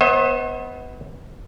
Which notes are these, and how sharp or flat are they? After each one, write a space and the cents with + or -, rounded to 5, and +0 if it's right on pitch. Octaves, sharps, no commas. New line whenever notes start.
B3 +5 C5 +45 D#5 +40